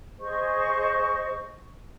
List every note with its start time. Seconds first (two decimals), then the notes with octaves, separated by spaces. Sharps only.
0.20 G#4 C5 D#5 C#6